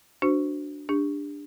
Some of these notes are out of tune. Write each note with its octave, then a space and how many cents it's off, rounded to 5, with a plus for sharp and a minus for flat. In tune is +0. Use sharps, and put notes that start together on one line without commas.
D4 +0 F#4 +0 C5 -20
D4 +0 G4 +40